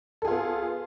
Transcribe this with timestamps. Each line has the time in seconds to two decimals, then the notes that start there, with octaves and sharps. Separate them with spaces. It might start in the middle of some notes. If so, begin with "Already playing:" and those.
0.22 A4
0.25 G#4
0.27 F4
0.30 B3